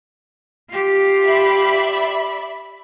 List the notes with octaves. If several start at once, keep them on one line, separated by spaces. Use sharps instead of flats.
F4 G4
D5 E5 B5